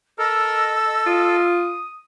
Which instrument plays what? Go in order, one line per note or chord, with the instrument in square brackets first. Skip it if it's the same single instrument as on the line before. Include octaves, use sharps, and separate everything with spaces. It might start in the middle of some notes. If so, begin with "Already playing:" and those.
[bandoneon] A4 [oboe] A#4 [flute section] D#5 E6
[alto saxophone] F4 [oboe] D#6